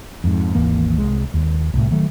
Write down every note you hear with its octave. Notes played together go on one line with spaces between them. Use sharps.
F2 G#2
G#1 D#2 E3 A#3
C2 G#3
D#2
C2 A2
D#3 F#3 A3